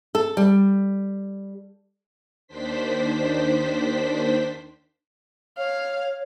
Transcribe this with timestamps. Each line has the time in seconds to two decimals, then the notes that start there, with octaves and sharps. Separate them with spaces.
0.15 A4
0.37 G3
2.48 D#2 D#3 D4 C5 B6
5.58 C#5 F5